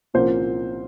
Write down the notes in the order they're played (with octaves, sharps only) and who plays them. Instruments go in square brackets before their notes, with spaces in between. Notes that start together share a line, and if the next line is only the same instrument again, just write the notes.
[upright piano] C2 A#2 F3 A#3 C#4 C5